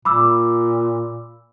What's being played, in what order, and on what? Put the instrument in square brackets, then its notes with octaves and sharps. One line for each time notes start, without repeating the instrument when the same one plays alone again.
[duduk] A#2 [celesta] B5 D6 E6